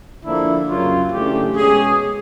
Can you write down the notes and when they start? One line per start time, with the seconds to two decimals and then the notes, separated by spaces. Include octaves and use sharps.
0.25 D3 F3 A#3 D4 E4
0.68 F#2 C#3 F#3 A#3 F4
1.12 C#3 E3 A3 D4 G4
1.55 B2 G#3 C#4 G#4